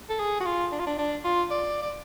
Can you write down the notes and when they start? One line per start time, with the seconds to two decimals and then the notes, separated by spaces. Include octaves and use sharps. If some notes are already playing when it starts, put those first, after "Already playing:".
0.09 A4
0.19 G#4
0.40 F#4
0.46 F4
0.72 D4
0.79 F4
0.87 D4
0.98 D4
1.24 F4
1.51 D5
1.82 D5